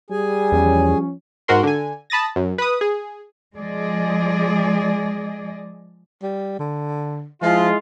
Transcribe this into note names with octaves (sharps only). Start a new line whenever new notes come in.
G3 G#4 G#5
E2 F3 C#4
G#2 F#4 A#4 C6
D3 G#5
A5 B5 D#6 A6 A#6
F#2
B4 D#6
G#4
F3 G#3 G#4 D5 D#5
G3
D3
F3 G#3 E4 F4